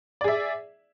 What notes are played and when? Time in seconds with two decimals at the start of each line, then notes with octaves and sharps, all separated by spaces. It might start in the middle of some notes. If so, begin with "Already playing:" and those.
0.21 D5
0.24 G#4
0.28 E5